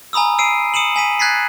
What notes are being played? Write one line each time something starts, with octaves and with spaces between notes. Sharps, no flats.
G#5 A#5 B5 D#6 E6
E6 C7 D7 D#7
D#6 C#7 D#7 E7 F#7
G#5 B6 D#7
F#6 G#6 A6 B6 C7